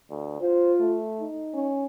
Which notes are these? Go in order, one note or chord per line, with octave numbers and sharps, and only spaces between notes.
D2
F4 C5
A3
D#4
C#4